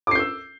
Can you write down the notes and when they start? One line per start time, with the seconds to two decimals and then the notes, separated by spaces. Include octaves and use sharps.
0.07 D6
0.11 C7
0.15 G6
0.19 E6